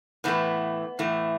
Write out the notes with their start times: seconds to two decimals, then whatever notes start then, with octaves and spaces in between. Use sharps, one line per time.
0.24 A2 E3 A3 B3
0.99 A2 E3 A3